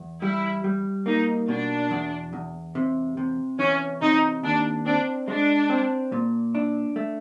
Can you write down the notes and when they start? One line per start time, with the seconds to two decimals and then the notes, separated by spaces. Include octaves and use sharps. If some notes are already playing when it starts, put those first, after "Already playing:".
Already playing: E2
0.22 G3 E4
0.64 G3
1.06 A#3 D#4
1.48 B2 D4
1.91 E2
2.33 E2
2.75 C3
3.17 C3
3.59 E3 C#4
4.02 C3 D#4
4.43 D#2 D4
4.85 C4 D4
5.28 G#3 D4
5.70 C4
6.12 A#2
6.55 D4
6.96 A3